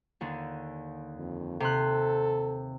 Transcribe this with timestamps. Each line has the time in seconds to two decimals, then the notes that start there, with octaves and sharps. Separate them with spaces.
0.21 D#2 D3
1.18 F2
1.60 C3 A4 C6 F#6